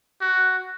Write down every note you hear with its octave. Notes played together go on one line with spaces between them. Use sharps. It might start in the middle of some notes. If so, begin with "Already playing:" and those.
F#4